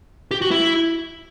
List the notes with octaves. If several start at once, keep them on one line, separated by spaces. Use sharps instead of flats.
G4
F#4
E4